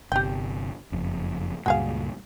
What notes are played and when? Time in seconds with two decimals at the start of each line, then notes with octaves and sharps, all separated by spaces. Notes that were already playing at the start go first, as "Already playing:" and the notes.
0.12 G1 C3 G4 G5
0.92 F#1 F2
1.66 C#2 G2 A#2 F#4 G#4 F5